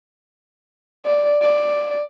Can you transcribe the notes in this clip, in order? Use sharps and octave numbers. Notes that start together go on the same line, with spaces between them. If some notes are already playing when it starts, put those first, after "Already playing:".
D5
D5